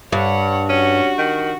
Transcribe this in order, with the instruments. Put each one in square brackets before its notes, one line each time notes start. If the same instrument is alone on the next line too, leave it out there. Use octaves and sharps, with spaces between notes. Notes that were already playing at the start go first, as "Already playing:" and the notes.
[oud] G2 [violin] C#5 F#5
[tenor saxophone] C#4 [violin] F#4
[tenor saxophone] D#3